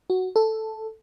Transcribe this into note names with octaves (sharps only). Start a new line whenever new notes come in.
F#4
A4